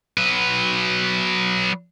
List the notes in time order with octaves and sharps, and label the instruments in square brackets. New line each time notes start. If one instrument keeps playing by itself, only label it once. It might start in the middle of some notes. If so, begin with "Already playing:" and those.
[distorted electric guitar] F#3 B4